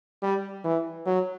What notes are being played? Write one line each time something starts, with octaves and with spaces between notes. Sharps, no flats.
G3
E3
F#3